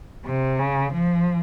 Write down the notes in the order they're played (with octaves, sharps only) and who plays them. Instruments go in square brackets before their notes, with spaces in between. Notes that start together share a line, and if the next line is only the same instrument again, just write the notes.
[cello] C3
C#3
F3